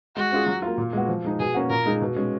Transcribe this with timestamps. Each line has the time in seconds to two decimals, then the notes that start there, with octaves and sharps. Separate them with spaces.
0.16 G#3 F#4
0.32 C#4 F4 G#4
0.46 F#3
0.62 A#3 F4
0.78 A#2
0.93 G#3 B3 F#4
1.08 F3
1.25 G#3 D#4 G#4
1.40 B2 G#4
1.54 A#3 C#4 F#4
1.70 A#2 A#4
1.86 G#3 D#4 G#4
2.02 B2
2.16 G#3 C#4